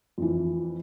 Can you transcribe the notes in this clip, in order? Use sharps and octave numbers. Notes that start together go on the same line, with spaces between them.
F2 E3